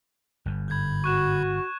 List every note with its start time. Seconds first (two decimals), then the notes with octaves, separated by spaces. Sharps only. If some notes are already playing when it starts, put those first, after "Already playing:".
0.46 G1 G2
0.68 G#2 D3 B5 G6 G#6
1.04 F#4 C#6 F#6 E7